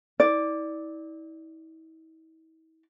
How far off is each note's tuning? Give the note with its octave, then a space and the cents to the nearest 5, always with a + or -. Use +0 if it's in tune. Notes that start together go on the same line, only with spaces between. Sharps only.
E4 -40 D5 +0